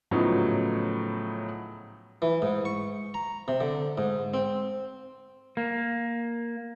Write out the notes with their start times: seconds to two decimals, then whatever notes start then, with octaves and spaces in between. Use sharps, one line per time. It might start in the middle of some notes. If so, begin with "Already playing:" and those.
0.11 A2 C#3 F3 F#3 B3 D#4
2.22 E3
2.42 G#2
2.65 C#6
3.14 A#5
3.48 C3
3.60 D3
3.98 G#2
4.34 C4
5.57 A#3